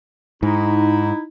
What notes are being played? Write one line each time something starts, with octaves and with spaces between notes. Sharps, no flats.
G#2 D#4 E4